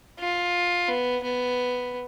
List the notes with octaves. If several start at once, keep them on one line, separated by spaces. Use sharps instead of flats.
F4
B3
B3